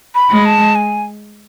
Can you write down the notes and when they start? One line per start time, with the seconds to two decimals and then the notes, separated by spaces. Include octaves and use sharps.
0.15 B5
0.30 G#3
0.45 A5
0.75 G#5